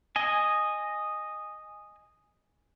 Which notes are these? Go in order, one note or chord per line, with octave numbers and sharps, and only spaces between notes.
D#5 G#5